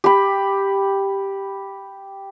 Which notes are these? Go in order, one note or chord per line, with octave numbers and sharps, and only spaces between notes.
G4 B5